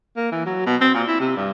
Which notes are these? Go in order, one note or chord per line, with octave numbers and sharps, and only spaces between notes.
A#3
E3
F#3
B2
C4
A#2
E4
C3
G2